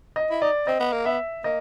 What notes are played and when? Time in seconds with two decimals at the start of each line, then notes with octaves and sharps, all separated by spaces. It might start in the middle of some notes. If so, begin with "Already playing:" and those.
0.16 D#5
0.30 E4
0.42 D#4 D5
0.67 C4 D#5
0.80 B3
0.93 A#3
1.05 B3 E5
1.44 A#3 D#5